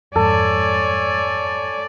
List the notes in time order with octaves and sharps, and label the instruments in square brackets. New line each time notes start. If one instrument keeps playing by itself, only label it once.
[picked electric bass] F2 G#2 [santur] A4 [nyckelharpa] C#5 G#5 [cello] D5